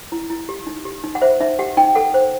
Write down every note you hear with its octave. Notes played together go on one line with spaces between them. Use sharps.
E4
E4
G4
D#4
G4
D#4
F#5
C5 E5
D#4 E5
G4 F#5
D#4 G5
A4 F#5
C5